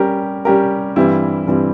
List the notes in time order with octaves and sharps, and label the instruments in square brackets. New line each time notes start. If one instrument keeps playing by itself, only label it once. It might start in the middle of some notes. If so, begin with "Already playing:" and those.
Already playing: [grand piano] G3 C#4 G4 A#4
G3 C#4 G4 A#4
G2 E3 G3 C4 E4
G2 E3 G3 C4 E4